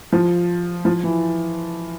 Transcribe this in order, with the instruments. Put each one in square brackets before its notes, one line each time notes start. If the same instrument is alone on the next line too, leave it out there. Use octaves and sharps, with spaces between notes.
[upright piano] F3
F3
E3